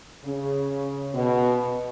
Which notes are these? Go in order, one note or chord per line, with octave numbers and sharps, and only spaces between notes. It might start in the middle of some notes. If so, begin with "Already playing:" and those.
C#3
B2